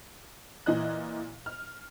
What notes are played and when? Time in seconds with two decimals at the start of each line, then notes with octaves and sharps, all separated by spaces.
0.66 A#2 E3 E4 D#5 F#6
1.46 F6